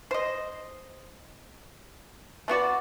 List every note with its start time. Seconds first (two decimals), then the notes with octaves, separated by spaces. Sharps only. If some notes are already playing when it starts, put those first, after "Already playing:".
0.11 C5 D#5
2.48 A3 B3 F#4 D5